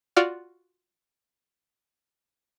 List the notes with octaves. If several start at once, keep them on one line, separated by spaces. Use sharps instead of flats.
F4 F#4 D5 F5